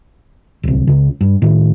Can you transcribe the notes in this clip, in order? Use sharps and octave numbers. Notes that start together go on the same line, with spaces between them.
D1 C2
C#2 C#3
G2
A2 D#3